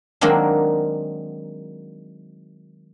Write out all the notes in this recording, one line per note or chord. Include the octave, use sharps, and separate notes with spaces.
D#3 F#3 G#3 A#3 C4 D4